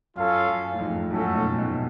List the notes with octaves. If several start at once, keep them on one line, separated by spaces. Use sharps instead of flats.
F#2 C#4 F4 A4 F5
F#2
A2
F2 G#2
F#2 A2 A3 C#4 F#4 A4
G#2 B2
G#2 B2